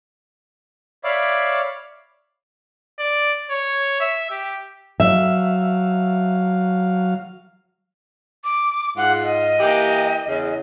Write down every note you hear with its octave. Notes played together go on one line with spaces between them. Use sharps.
C#5 D5 E5 F5 B5 D6
D5
C#5
E5
G4
F#3 E5 F5
D6
G#2 F4 F#5
D#5
E3 A#3 G4
E2 C#3